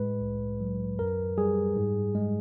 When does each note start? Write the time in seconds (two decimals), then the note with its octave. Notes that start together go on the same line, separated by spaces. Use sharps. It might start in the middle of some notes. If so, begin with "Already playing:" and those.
Already playing: A2 G#3 B4
0.21 C2
0.61 F#3
0.99 F#2 A#4
1.38 G3 G#4
1.76 G#2
2.15 G#3